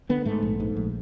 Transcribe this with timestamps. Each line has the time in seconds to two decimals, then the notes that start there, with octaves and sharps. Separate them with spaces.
0.09 D3 B3
0.25 G#2 A3
0.43 A#1
0.60 G#2
0.77 A#1